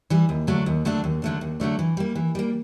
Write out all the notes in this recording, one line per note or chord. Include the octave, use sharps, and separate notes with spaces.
E3 G3
D#2
D3 F#3 A3 D4
D#2
D3 F#3 A3 D4
D#2
D3 F#3 A3 D4
D#2
D3 F#3 A3 D4
E3
G3 A#3
E3
G3 A#3